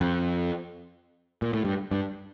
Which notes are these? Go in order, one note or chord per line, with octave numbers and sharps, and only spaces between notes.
F2
A#2
A2
G2
G2